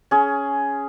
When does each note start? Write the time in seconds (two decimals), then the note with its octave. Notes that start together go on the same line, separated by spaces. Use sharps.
0.11 C#4 G#4